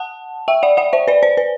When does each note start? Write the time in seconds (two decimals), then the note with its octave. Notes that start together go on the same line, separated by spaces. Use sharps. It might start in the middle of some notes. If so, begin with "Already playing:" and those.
Already playing: F#5 A5
0.48 E5 G5
0.63 D5 F#5
0.77 D5 F#5
0.93 C5 E5
1.08 B4 D5
1.23 C5
1.37 B4